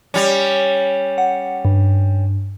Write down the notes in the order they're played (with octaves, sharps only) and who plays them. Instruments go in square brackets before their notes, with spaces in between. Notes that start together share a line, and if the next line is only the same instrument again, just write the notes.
[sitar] G3 C#4
[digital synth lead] F#5
G2